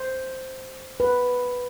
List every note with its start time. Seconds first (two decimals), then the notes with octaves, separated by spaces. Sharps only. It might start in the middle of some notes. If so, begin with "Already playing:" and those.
Already playing: C5
1.00 B4